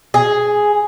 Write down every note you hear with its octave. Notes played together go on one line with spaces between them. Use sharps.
G#4